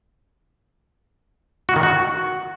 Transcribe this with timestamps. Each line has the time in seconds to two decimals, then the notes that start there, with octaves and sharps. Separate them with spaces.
1.69 F#4
1.76 D#3
1.83 F#4